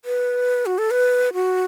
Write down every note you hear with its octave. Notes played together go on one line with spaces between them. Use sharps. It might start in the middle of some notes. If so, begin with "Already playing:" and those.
B4
F#4
A4
B4
F#4